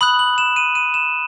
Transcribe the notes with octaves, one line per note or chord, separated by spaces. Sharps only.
B5 D#6 F#6 F#7
F#7
E7
D#7
D#7
E7